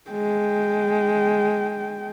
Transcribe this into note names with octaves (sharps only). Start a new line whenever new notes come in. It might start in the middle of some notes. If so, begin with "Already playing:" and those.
G#3 G5